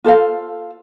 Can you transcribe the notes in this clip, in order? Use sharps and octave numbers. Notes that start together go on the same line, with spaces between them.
F4 A4 C5 F5